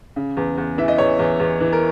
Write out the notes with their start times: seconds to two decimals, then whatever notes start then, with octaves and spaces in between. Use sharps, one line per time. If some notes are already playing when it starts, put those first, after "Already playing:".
0.16 C#3
0.37 E2
0.58 E2
0.78 E3 E5
0.88 D#5
0.98 E2 C#5
1.19 E2
1.40 E2
1.60 E3
1.73 A#4